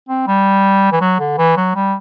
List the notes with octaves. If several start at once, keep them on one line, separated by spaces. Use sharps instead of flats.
C4
G3
E3
F#3
D3
E3
F#3
G3